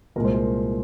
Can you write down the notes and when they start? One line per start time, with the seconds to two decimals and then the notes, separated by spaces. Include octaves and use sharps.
0.16 C2 A#2 G#3 A#4
0.25 C5
0.34 A#4